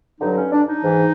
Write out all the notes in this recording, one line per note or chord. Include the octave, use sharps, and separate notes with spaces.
G2 D3 F#3 D#4
C#4
D4
D#4
G#2 E3